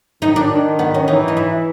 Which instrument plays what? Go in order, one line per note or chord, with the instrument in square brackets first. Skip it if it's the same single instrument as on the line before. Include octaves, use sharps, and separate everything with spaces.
[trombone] D#3 [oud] D#4
[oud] D4
[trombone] D#3
[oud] B3
C#4
[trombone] E3 [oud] D#4
[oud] D#4
E4